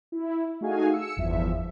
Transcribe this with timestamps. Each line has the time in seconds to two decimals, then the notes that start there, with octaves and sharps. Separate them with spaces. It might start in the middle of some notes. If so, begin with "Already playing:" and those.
0.12 E4
0.61 A3 D#4 F#4 G#4 F5 G#5
0.93 E6 C#7
1.17 G1 E2 F3 E5